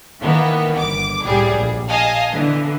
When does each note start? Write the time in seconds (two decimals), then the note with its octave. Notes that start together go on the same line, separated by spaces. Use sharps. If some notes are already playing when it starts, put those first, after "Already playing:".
0.20 D#3 E3 A#3 B3
0.77 G1 D6
1.25 C2 A2 G3 G#4
1.54 A#1
1.88 D#5 F5 G#5 A5
2.30 D3 E3 B3